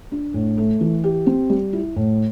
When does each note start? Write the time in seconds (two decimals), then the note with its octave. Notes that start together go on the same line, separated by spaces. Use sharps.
0.12 D4
0.34 A2
0.58 A3
0.81 E3
1.04 G4
1.26 C4
1.50 G3
1.73 E4
1.96 A2